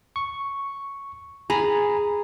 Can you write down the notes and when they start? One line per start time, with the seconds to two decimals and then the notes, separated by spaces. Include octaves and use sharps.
0.16 C#6
1.50 G#4 G#5 A#5 B5